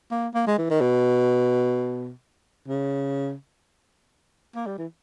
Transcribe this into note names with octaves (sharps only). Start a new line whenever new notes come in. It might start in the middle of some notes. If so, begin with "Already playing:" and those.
A#3
A#3
G#3
E3
D#3
B2
C#3
A#3
G3
E3